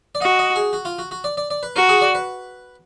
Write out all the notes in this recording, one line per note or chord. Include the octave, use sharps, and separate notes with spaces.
D5
F#4 D#5
D#5
G#4
F#4
F4
F#4
F#4
D5
D5
D5
B4
F#4 A#4
G#4
D5
B4